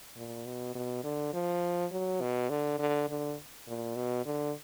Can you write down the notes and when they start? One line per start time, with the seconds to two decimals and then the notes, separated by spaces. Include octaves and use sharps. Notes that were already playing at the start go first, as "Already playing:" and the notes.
0.16 A#2
0.45 B2
0.75 B2
1.03 D3
1.33 F3
1.92 F#3
2.21 B2
2.50 D3
2.79 D3
3.09 D3
3.67 A#2
3.96 B2
4.26 D3